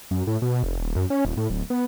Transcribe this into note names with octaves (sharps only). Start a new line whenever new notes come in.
F#2
A2
B2
F1
D#1
F#2
C#4
D#1
A2
D1
B3